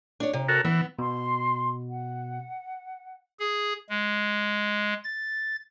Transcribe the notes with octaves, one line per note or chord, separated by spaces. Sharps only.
D4 C#5
C3
F#4 A4 A#4
E3 B3
B2 C6
F#5
G#4
G#3
A6